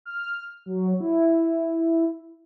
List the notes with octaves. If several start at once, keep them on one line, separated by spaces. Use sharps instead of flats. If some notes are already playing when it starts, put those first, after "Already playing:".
F6
F#3
E4